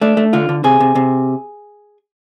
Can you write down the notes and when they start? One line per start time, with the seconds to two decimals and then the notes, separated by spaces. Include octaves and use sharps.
0.01 A3 D4
0.17 A3
0.33 D3 F4
0.49 D3
0.64 C3 G#4
0.80 C3
0.95 C3